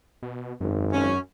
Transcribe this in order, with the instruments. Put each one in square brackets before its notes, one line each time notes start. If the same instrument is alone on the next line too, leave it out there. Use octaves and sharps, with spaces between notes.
[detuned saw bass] B2
[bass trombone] G#1 [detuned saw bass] F#2
[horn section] C#4